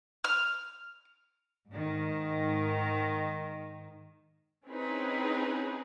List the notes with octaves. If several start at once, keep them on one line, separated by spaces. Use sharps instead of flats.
F6
G#2 D#3
C4 C#4 D#4 E4 G#4 B4